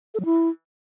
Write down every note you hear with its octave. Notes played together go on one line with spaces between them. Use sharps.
A4
F#3
E4